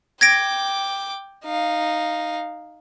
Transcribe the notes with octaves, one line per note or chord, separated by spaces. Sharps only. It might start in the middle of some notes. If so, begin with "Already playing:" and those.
G5 D6 G#6 A#6 D7
D#4 F5